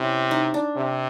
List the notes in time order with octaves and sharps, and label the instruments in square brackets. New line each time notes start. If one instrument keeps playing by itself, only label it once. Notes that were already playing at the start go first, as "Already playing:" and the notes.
Already playing: [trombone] C3 [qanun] C#4 E4
[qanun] D#4
D4
[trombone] C3